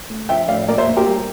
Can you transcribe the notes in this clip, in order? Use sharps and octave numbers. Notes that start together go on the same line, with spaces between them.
A3
F3 E5 G5
A2 D5 F5
A#2 A#4 D5
C5 E5
A#3
G4 A#4
G3